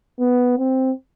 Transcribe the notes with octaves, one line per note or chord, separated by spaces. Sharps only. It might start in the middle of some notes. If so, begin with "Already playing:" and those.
B3
C4